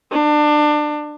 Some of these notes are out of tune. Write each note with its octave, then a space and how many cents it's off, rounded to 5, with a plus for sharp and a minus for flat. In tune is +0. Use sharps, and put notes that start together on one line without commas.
D4 +25